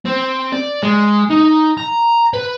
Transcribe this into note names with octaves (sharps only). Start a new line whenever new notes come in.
C4
D5
G#3
D#4
A#5
B4